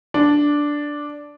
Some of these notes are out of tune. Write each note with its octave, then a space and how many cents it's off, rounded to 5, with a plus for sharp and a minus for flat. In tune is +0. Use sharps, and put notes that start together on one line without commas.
D4 -5